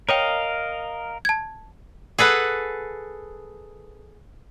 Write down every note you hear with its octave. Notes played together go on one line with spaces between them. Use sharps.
A#4 C#5 D#5 F5 G5
A5 G#6
G#4 A4 B4 F#5